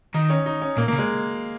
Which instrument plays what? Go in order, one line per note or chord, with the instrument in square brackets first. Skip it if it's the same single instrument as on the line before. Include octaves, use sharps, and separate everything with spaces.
[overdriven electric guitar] D#3 [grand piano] D#4
[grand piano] C#4
D#4
C#4
[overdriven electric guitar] A#2 [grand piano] A#3
[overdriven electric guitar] C#3 [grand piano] A#3
[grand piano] G#3